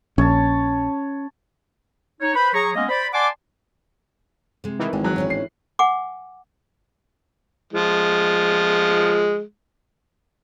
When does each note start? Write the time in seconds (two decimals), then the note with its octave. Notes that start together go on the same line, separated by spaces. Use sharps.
0.18 A#1 C#4 C#5 A5
2.21 D#4 C#5
2.35 B4 C5 B5
2.54 F#3 G#4 A#5 C#6
2.76 G#3 A#3 B3 C#4 D#5
2.89 C5 D5 B5
3.14 D5 F#5 G#5 A5 C6 D6
4.64 C3 G#3
4.79 D#3 E3
4.93 G#1 G#3
5.04 F#3 F#6
5.16 A2 C#4 D4
5.30 C7
5.79 F#5 G#5 D6
7.73 F3 G#3